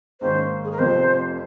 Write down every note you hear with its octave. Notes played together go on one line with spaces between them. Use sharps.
G#2 D#3 A#3 C#4 C5
G#4
A#4
F1 F2 C3 F3 C5